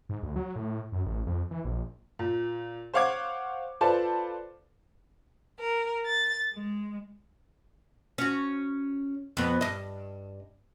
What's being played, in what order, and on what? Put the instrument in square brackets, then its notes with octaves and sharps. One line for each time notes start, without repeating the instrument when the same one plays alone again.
[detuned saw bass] G#2
D2
F#3
A2
F#2
A1
F2
E3
A#1
[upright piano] A#2
C5 C#5 F5 F#5 D6 G#6
F4 A4 B4 C5 D5 A5
[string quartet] A#4
A6
G#3
[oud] C#4 F#4
F2 B3
G2 D#5